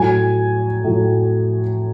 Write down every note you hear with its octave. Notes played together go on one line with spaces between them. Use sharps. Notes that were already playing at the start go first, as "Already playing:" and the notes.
Already playing: A2 F#3 G#5
A2 F#3